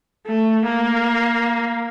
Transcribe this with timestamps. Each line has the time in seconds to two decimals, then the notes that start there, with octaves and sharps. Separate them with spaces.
0.26 A3
0.65 A#3